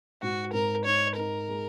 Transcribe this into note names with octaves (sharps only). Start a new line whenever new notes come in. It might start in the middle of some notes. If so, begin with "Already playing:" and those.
G#2 F#4
G#2 A#4
D#4 C#5
D#4 A#4
G#3